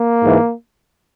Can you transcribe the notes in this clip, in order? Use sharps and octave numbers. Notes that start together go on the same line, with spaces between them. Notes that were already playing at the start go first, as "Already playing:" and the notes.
Already playing: A#3
G#2 E3